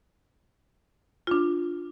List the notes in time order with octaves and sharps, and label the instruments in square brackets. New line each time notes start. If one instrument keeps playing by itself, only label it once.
[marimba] D4 F4